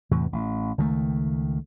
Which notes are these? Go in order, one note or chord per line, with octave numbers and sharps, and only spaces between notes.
E2 A2 C3 E3
A1
C#2 D#3 F3 A3